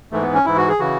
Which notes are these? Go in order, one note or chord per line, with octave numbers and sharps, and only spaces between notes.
G#2 E3 A3
B3
C#4
G#2 E3 E4
F#4
G#4
C#3 E3 F#4